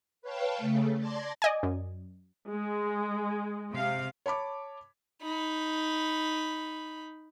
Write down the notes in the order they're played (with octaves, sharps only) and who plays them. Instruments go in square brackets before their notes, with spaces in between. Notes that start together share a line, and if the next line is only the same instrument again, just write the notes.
[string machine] B4 C#5 F5 G5 A5
C#3 A3
D5 A5 C6 G#6 A#6
[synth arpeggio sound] D5 D#5 G#5
F#2
[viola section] G#3
[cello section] C3 F5
[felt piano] C#5 A5 B5 D6
[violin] D#4 B5